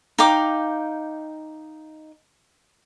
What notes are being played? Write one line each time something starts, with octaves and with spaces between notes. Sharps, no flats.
D#4 F5 G5 D6